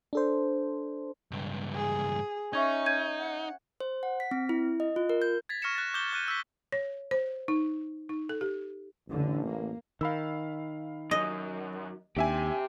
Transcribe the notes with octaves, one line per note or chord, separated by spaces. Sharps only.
D4 A4 C5
C#2 G2
G#4
C#4 D#4 E5 C#6 G#6
G6 G#6 D#7
F#5
C5
F#5
B6
C4
E4
D#5
F4
A#4
G6
G#6 A6 B6
C#6 F6 A#6 C#7 E7
F#6 A6
D6 G6 E7 G7
F6 F#6 D#7
E6 B6
C#5
C5
D#4
D#4
A4
G4
A1 D3
A#3
D#3 F5 B5 E6
F#2 D#5
D#2 C4 D4 G4 E5 G#5